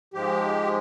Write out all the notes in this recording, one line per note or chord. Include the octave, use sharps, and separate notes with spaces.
G#2 F3 G#3 G4